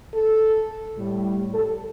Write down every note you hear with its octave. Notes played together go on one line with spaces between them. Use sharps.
A4
A2 G3
A4